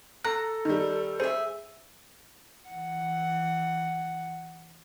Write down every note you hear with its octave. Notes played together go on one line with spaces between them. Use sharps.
A4 A#5 F#6
D#3 G3 D#4
G#4 C5 E5
E3 F#5